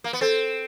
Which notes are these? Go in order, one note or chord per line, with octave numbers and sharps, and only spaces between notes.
A#3
B3
C4 A4